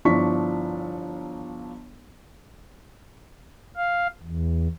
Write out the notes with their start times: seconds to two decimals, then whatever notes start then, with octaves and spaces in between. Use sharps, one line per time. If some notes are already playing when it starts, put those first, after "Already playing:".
0.05 G1 F3 D4 E4 C#6 B6
3.76 F5
4.23 E2